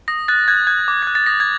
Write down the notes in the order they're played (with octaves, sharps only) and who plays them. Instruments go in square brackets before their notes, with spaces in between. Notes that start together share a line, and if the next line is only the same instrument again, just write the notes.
[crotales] D#6 A#6
F#6 A6
F#6 G#6
F#6 G#6
D6
F#6 G#6
A6
D#6 A#6
G#6